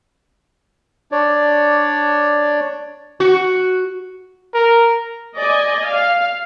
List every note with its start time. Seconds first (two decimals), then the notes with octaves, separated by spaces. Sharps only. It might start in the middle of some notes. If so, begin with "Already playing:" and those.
1.12 D4 C#5 D5
3.20 F#4
4.54 A#4
5.37 D5 D#5 G#5
5.88 F5